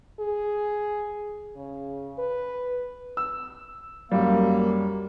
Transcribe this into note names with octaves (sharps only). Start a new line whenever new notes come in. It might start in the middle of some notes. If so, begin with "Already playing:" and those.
G#4
C#3
B4
E6
F#2 G3 A#3